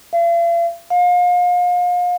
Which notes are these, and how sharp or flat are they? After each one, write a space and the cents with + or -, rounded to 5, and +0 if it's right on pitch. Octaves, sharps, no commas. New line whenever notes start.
F5 -45
F5 +35